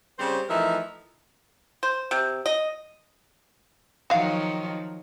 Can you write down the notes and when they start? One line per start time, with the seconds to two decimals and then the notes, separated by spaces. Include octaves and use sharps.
0.19 C#3 G3 C4 C5
0.48 E3 F3 A3 D#4 A#4 E5
1.83 C5
2.11 C3
2.46 D#5
4.10 D#3 F3 F#3 F#4 F5